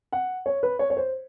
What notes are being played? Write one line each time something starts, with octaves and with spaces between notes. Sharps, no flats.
F#5
C#5
B4
C#5
C#5
C5